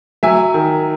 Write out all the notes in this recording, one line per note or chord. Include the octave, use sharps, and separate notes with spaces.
F#3 E5 G#5
D#3